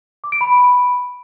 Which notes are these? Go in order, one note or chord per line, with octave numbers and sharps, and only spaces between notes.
D6
D7
B5